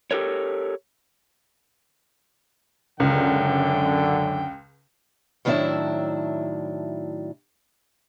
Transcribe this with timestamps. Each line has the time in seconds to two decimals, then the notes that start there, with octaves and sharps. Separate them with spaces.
0.11 G4 A4 A#4 C#5
3.00 C#2 F#2 D3 G5
5.45 A2 D#3 F#3 D4 E4 E5